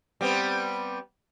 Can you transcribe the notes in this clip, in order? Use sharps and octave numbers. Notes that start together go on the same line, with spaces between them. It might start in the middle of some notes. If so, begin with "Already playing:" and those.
G3 B3 C4